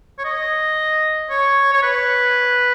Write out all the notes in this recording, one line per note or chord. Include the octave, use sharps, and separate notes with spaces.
C#5
D#5
C#5
C#5
B4